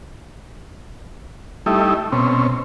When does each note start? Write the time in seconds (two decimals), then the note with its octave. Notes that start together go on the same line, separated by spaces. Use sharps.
1.66 G3 A3 D#4 E4
2.12 B2 C4 C#4